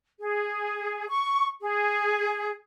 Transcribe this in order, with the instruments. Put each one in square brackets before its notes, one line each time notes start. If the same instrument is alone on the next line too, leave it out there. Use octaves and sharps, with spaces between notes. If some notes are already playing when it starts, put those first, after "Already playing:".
[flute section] G#4
C#6
G#4